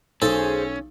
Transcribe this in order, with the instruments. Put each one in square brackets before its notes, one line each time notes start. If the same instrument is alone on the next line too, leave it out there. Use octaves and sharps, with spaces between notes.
[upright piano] B1 [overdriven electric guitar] C#4 [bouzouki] G#4 C5 [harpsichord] A4